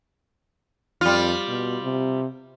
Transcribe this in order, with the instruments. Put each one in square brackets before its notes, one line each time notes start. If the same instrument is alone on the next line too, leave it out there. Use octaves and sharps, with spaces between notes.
[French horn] F2 [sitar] G3 F4
[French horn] B2
C3